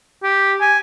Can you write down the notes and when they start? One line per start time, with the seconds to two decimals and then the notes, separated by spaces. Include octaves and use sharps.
0.23 G4
0.61 G#5